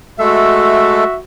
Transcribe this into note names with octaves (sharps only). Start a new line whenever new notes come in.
G#3 A3 F#4 A4 E5